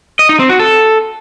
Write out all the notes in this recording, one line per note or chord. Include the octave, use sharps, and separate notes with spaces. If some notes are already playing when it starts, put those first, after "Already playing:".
D#5
D#4
C4
F#4
A4